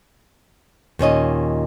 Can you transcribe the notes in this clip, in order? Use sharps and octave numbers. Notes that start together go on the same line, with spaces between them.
D#2 A#2 C#4 D#5